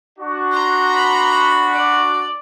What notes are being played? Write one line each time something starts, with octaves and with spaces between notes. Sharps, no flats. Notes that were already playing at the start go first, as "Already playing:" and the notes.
D4 F#4
A#5 C6
B5
D5